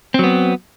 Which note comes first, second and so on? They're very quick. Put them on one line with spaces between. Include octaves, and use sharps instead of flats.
C4 F#3 B3